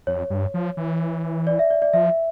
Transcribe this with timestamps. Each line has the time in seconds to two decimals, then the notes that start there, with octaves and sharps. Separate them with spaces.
0.07 F2 C#5
0.30 G2
0.54 F3
0.77 E3
1.47 D5
1.59 E5
1.71 D5
1.82 D5
1.93 F3 E5